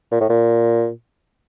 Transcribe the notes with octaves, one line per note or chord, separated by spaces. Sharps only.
A#2
A2
A#2